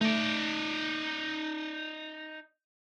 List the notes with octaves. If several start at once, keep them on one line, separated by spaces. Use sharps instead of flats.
A3 D#4 D5